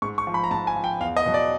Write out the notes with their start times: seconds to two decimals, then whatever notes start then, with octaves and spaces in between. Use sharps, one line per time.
0.02 G#2 C#6
0.18 C#6
0.27 F3
0.34 B5
0.44 A#5
0.51 G#2 A5
0.67 G#5
0.76 F3
0.84 G5
1.01 E2 F5
1.17 D#5
1.26 B2 F#3
1.34 D5